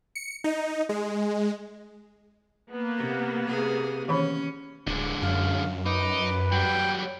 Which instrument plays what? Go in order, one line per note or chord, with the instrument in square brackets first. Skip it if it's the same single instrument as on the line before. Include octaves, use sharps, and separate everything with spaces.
[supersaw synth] C#7
D#4
G#3
[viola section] A#3 B3
[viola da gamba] C3
C3 G#4
[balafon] D#3 E3 B5 [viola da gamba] C#4
[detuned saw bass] D1 [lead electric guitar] D3 G#3
[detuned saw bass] F#2 [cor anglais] F5
[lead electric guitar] D#4 [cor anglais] B4 [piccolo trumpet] D6
[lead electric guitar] F#3 G3 [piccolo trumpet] G5